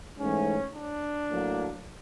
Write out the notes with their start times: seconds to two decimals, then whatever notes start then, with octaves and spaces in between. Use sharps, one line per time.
0.18 G#2 E3 A3 C#4
0.75 D4
1.31 A2 F#3 A#3